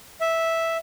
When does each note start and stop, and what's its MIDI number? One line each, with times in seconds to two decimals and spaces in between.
0.21 0.77 76